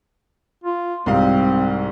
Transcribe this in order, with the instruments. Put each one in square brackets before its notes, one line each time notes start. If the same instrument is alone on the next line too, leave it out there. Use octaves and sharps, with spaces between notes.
[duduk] F4
[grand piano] C2 G#2 F5 [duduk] C4